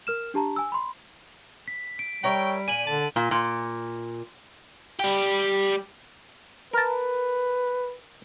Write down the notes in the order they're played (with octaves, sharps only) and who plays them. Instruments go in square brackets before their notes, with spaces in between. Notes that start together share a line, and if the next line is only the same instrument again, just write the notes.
[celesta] A#4 F6 E7
D4 G4 A5 A#5
G#5 E6
B5 C6
[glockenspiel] B6
D7
[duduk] G3 [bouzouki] A#4 C#5 E5 [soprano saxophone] G5
[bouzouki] A#2 [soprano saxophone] G#5 [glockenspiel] D#7 F#7
[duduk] D3 [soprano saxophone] A5
[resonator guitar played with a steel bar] A#2
A#2
[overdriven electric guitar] G3 G4
[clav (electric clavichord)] A#4 A5 [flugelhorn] B4